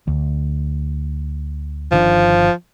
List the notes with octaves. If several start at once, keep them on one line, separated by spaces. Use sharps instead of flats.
D2
G1 D#3 F3 D4